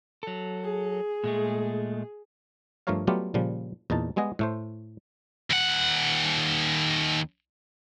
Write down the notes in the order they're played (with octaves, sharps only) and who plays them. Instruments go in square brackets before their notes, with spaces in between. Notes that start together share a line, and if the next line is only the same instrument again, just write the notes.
[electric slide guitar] F#3 A4
[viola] G#4
[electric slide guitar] A#2 G#3 A3
[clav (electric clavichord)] G2 F3 A3 A#4 C#5 F5
F#3 G3 A3 B3 F4 G4
A#2 C#3 F3 G3
E2 A#2 D#4 A5
G3 G#3 B3 G#4 D#5 F#5
A2 A3 C5
[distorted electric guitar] D#2 F#5